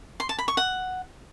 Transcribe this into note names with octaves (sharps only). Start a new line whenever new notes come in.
C6
A5
B5
C#6
F#5